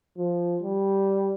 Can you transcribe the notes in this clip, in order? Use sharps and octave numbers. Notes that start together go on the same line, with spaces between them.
F3
G3